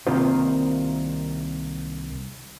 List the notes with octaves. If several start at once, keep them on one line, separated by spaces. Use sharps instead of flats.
C2 C3 D#3 A#3 F4 C5